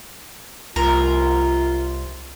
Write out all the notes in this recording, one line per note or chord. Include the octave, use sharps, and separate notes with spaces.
C2 F4 A#4